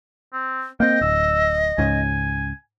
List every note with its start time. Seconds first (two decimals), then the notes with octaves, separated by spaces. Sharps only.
0.33 C4
0.80 A#3 C4 D#5 G5
1.01 D1 E6
1.78 C#2 G#2 C#3 G#5